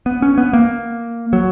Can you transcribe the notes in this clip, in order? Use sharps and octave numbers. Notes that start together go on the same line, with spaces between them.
B3
C#4
B3
A#3
F#3